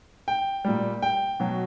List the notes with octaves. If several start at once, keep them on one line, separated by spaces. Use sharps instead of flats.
G5
A#2 G3
G5
B2 F#3